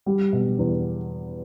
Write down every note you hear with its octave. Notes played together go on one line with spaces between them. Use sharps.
G3
B2
E2